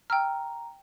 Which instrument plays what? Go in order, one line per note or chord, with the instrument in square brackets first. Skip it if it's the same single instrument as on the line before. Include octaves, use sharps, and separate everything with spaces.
[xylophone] G5 E6 F6 [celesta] A#5